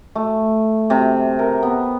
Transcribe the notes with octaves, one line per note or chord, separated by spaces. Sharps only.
A3
C3
A#4
B3